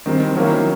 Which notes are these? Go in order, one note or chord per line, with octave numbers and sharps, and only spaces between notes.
D#3 G3 C4
D#3 F#3 A#3 C#4 E4